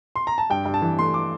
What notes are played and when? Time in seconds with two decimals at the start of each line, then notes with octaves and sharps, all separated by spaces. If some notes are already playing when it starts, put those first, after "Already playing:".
0.16 C6
0.27 A#5
0.38 A5
0.50 G2 G5
0.65 G2
0.74 A5
0.82 E3
0.98 A3 C6
1.14 D6